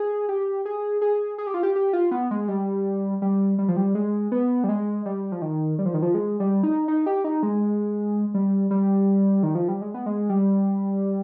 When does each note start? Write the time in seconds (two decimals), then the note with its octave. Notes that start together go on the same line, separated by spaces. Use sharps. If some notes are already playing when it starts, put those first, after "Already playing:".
Already playing: G#4
0.29 G4
0.65 G#4
1.02 G#4
1.38 G#4
1.47 G4
1.54 F4
1.63 G4
1.76 G4
1.93 F4
2.11 B3
2.31 G#3
2.48 G3
3.22 G3
3.58 G3
3.68 F3
3.77 G3
3.95 G#3
4.32 B3
4.64 G3
4.69 G#3
5.06 G3
5.32 F3
5.42 D#3
5.79 G3
5.86 F3
5.94 D#3
6.02 F3
6.14 G#3
6.40 G3
6.63 D#4
6.88 D#4
7.06 G4
7.24 D#4
7.43 G#3
8.34 G3
8.71 G3
9.43 D#3
9.55 F3
9.69 G3
9.82 G#3
9.94 B3
10.06 G#3
10.29 G3